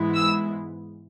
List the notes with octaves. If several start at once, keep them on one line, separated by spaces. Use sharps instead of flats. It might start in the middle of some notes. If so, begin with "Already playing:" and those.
Already playing: G#2 E3 G#3 B3 E4
E6